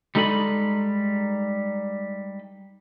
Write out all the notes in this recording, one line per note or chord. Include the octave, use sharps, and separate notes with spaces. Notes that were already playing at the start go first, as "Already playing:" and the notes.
G3 G#3 D#4 A4 D#5 B5